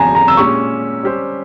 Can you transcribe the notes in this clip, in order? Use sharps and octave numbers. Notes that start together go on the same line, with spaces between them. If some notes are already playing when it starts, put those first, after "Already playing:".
Already playing: E2 C#3 F3 G#5 A#5
A#5
E6
A#2 G#3 C#4 G4 C#6
G3 C#4 G4 C5